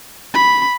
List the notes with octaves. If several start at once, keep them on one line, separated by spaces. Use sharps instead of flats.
B5